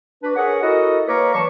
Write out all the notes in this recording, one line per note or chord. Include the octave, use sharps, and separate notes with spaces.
D4 F#4 B4
G#4 A#4 C#5 F#5
E4 F#4 A4 A#4 D#5
A#3 B4 C#5 F5 A#5 D6
E3 F#3 D5 A5 C#6